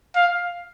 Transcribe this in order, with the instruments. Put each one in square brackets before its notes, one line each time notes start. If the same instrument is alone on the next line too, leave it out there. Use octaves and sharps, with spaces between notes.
[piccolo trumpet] F5